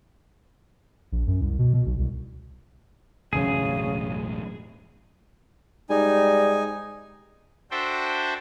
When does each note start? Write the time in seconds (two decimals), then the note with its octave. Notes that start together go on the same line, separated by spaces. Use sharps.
1.12 A#1
1.27 F#2
1.41 C2
1.59 B2
1.74 B2
1.86 B1
1.98 C2
3.33 E1 A1 F#2 C#3 G#4
5.90 G#2 G3 D#4 G#5
7.71 D4 F#4 A4 C5 E5 G5